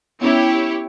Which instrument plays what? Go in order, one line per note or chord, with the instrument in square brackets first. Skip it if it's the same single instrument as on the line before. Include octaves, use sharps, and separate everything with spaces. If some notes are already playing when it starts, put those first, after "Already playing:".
[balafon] B3 C#4 [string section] E4 G4 C#5